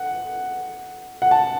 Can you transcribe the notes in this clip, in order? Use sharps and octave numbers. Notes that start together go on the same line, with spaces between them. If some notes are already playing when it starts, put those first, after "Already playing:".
Already playing: F#5
F#5
A5